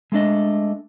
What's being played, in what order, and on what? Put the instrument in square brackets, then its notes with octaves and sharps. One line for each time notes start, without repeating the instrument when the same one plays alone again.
[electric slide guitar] G#3 A3 D4 D#5